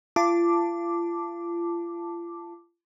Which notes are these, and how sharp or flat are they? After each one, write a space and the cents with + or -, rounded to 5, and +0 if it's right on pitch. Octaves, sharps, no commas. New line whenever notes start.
F4 -35 A5 +5 D6 +0